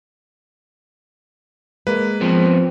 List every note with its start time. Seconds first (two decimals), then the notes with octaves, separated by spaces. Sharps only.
1.87 G#3 A#3 B4
2.21 F3 B3 C4